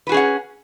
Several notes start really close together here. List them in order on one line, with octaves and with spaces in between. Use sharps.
B4 F#4 G#4 C#4 F#5